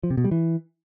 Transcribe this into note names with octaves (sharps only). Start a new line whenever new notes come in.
F3
C3
B2
G3
E3